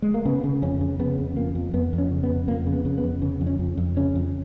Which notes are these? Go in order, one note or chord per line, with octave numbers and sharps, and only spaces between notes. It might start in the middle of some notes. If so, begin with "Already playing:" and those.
G#3
A#3
C#3 B3
C#3
F2 C#4
C#3
C#3 B3
F2
F2 A#3
F2
F2 B3
F2
C#4
C#3
B3
F2
F2 A#3
C#3
B3
C#3
B3
F2
C#3
F2
C#4
F2
F2
C#3 C#4
F2